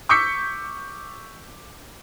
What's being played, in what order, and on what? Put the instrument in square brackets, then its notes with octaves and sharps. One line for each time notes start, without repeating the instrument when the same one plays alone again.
[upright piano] C#6 D6 E6 G6 B6 C#7